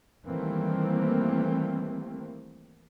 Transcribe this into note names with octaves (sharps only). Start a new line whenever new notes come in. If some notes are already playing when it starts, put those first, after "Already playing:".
D#3 E3 G3 A3 A#3 C4